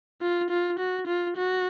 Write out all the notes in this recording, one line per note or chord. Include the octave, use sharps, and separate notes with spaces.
F4
F4
F#4
F4
F#4